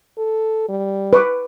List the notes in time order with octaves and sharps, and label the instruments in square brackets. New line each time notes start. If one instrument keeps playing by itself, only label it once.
[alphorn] A4
G3
[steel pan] B4 C#6 D6